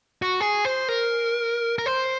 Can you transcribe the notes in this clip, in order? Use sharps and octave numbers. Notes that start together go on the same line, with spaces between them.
F#4
G#4
C5
A#4
A#4
C5